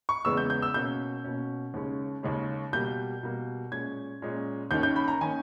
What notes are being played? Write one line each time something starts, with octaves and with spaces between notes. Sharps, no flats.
C#6
E2 C#3 G#3 B3 E6
G6
G6
E6
B2 A#3 C#4 G6
B2 A#3 C#4
D#2 C#3 G#3 C#4
D#2 C#3 G#3 C#4
B2 G3 A#3 G6
B2 G3 A#3
A#2 G#3 C#4 G#6
A#2 G#3 C#4
D#2 D#3 A#3 C#4 G6
G6
B5
A#5
D#3 A#3 C#4 G#5